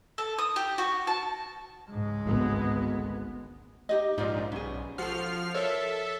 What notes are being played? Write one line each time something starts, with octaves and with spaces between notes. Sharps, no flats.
A4
D#6
G4
F#4
A5
C#2 G#2 G#3
G#1 D2 B3
D#4 G4 D#5
A#1 G#2 D#4 F4 D5
B1 C#4 G#4
F3 F#4 A4 F6 C7
A4 A#4 C#5 E5